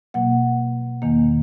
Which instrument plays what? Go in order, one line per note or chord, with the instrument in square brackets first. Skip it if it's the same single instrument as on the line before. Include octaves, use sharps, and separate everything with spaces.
[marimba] B2 F#3 A#3 F#5
E2 D#3 A#3